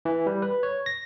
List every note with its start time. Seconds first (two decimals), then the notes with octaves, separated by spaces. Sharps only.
0.05 E3
0.27 G3
0.42 B4
0.63 C#5
0.86 A#6